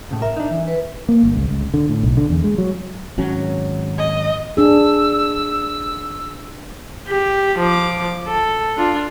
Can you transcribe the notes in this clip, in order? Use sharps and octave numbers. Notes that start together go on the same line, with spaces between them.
A2 C#3
A#4 E5
D4 D#4
E3
B4
A#3
G1
C#2
C#2
D3
A2
B1
D3
E2
G#3
F#3
G#1 F#3 C#4
D#5
D4 G#4 E6
G4
F3 D6
A4
D4 F4